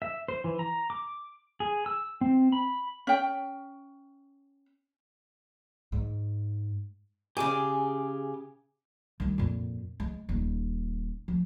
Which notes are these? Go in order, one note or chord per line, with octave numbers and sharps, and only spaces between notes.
E5
C5
E3
A#5
D6
G#4
E6
C4
B5
C#4 G5
G#2
C#3 G4 G#4 G#5 D6
D#3 G3
F2 A#2
G#3
D#1 D#4
F3